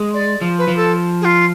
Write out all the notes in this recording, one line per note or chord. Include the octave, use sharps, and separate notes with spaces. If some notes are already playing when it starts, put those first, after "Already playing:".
Already playing: G#3
D5
F3
B4
F3
A4
G#4
F4